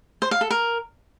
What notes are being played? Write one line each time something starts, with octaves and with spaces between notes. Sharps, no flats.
C5
F5
A4
A#4